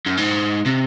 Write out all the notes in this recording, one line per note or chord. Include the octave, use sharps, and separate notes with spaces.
F#2
G#2
C3